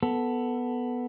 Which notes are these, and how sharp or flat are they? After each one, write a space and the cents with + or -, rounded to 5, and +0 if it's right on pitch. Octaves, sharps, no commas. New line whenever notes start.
B3 +0 A4 +0